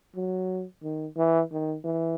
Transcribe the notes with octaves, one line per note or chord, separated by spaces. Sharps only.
F#3
D#3
E3
D#3
E3